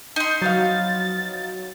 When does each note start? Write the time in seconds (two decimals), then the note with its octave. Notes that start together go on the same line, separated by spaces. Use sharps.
0.16 D#4 C6
0.42 F3 F#3 B3 F5 A6